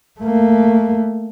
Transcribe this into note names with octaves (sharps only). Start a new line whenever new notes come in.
A3 A#3